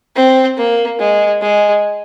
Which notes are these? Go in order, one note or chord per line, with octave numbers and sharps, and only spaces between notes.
C4
A#3
G#3
G#3